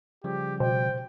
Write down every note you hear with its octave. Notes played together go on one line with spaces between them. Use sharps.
C#3 F3 G3 G4
B2 C5 G5